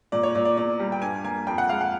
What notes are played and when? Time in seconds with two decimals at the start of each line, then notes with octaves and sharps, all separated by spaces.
0.12 A#2 D5
0.23 C#5
0.35 A#2 D5
0.45 D5
0.57 E2 D5
0.80 G3
0.92 G5
1.02 G2 G#5
1.24 A#3 G#5
1.47 F2 G5
1.58 F#5
1.69 G#3 F5
1.81 F#5